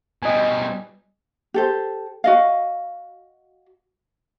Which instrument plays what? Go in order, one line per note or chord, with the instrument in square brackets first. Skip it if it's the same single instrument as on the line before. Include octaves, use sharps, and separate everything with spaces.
[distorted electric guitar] B2 G3 [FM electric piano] D#5 G#5
[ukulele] G4 A4 C5
F#4 D#5 F5